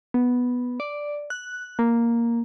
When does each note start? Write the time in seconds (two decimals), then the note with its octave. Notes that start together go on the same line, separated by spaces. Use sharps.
0.14 B3
0.80 D5
1.30 F#6
1.79 A#3